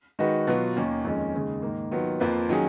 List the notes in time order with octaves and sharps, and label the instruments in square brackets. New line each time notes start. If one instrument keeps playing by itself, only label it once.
[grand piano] D#3 G#3 D#4 F#4 B4
B2 F#3 B3 F4
D#2 D#3 A#3 C#4
F2 D#3 G#3 C#4
D#2 C#3 G#3
G#2 D#3 A#3
D#3 F#3 B3 F4
F2 F3 A#3 F4 B4
D#3 F#3 C#4 G#4